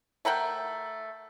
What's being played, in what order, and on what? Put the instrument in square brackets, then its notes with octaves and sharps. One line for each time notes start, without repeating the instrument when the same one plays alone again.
[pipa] A3 A#4 F#5 G5